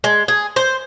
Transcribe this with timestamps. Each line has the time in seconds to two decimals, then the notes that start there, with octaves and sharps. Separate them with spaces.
0.04 G#3
0.28 G#4
0.56 C5